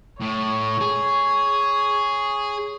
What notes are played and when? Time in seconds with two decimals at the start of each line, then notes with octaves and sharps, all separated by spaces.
0.21 A2 C#5
0.81 G#4